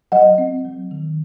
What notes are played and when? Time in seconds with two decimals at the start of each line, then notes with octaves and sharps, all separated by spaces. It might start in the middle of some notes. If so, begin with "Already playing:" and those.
0.12 F#3 D#5 F#5
0.38 C4
0.65 F#3
0.91 D#3